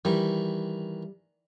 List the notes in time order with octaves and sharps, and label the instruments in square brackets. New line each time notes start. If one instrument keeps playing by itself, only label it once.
[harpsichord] D#3 E3 [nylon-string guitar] G3